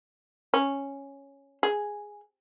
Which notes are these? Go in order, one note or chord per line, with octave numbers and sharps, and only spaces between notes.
C#4
G#4